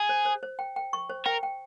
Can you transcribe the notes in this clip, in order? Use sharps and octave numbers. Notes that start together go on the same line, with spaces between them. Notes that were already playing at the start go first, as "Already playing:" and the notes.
Already playing: G#4
C5
C5
C5
G5
G5
C#6
C5
A#4 G5
G5